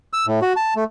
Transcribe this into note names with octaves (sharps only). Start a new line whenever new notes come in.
E6
A2
F#4
A5
A3